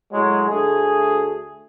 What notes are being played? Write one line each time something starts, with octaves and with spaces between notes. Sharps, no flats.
A2 F#3 G#3
D2 A3 G#4